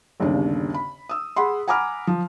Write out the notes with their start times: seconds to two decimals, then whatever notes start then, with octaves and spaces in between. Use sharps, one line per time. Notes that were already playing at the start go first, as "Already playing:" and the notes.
0.20 G1 D#2 C#3 D4
0.74 B5
1.09 D#6 E6
1.36 G#4 F#5 B5 C6
1.67 F#5 G#5 A#5 B5 D6 F6
2.07 F3